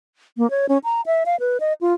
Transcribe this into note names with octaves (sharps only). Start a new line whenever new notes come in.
A#3
C#5
C#4
A#5
E5
F5
B4
D#5
F4